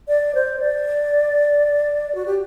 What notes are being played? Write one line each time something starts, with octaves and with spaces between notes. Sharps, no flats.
D5
C5
D5
F#4
G4